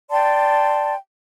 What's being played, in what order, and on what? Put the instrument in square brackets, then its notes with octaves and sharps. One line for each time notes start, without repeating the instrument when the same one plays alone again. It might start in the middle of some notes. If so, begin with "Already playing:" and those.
[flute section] D5 G5 A5 C6